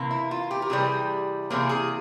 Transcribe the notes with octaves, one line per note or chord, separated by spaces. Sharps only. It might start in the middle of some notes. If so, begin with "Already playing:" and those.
Already playing: C3 E3 A#3
E4
F4
G4
A#4
C3 E3 G3 G#4
C3 E3 A#3 G#4
G#4